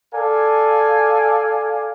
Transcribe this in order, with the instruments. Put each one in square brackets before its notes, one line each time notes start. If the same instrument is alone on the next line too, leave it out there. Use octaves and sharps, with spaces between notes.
[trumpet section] A4 D5 F5 G#5